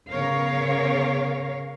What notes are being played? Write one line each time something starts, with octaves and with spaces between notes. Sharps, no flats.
C#3 B3 A#4 C#5 F5